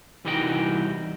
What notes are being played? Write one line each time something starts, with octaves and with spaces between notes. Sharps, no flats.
C2 E3 G3 D#4 F#4 G5